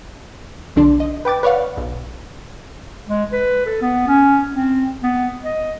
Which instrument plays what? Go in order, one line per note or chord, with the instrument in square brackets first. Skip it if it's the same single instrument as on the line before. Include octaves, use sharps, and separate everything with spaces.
[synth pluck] B1 D3 D4 C6
D#5
B4 G5 D6 A6
B4 C#5 D5 F5 F#5
B1
[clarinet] G#3
B4
A4
B3
C#4
C4
B3
D#5